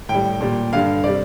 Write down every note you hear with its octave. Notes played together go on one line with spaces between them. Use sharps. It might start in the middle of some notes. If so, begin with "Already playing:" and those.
A2 G5
G3
A#2 G3
G2 D3 G3 F5
C3 G3 D5